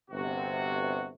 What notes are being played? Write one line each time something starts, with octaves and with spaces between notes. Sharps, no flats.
G1 C3 F#4